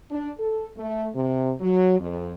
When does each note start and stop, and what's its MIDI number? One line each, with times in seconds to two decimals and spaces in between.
0.11 0.32 62
0.39 0.67 69
0.77 1.07 57
1.15 1.51 48
1.60 1.97 54
1.99 2.33 41